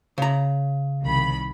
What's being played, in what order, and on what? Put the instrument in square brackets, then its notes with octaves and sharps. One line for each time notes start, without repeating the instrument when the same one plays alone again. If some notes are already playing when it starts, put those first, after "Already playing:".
[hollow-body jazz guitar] C#3 A#5
[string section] C2 D#3 B5